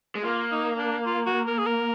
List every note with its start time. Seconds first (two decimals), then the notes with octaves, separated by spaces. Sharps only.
0.15 G#3
0.23 A#3 F4
0.52 D#4
0.78 D4
1.06 F4
1.26 F#4
1.47 A#4
1.58 G#4
1.66 A#4